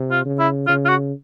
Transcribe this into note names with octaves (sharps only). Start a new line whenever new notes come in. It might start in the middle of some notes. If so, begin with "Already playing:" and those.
Already playing: C3
F4
C#3
E4
C#3 F4
F4
F#4